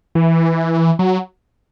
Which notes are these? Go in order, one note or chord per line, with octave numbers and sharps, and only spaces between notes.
E3
F#3